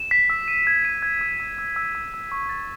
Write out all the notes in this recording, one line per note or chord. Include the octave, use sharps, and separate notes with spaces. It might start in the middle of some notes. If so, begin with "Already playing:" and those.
Already playing: E7
B6
E6
D#7
G#6
D#7
G#6
E6
E6
E6
E6
E6
E6
C#6
A6